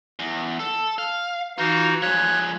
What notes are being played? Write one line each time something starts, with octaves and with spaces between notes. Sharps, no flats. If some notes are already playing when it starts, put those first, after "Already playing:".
E2
A4
F5
E3 D#4 F4 F#4 F5
F3 G#3 C#5 F#6